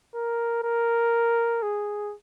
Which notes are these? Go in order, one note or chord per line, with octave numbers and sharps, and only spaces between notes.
A#4
A#4
G#4